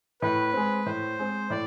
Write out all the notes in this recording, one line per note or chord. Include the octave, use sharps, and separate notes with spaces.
A2 B4
G#3 C4
A2 C5
G#3 C4
A2 D5